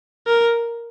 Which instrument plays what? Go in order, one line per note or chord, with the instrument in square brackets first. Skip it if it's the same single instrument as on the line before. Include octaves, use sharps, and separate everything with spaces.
[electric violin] A#4